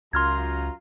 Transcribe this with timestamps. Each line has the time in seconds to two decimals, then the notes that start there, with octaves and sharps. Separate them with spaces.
0.13 C#2 F#2 F4 A#5 C6 F6 G#6